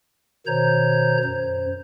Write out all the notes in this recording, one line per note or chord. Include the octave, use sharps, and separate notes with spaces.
B2 D#3 C5 C#5 A#5 G6
F#2 C5